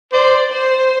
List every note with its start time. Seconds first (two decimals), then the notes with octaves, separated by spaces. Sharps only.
0.13 C5 D5
0.52 C5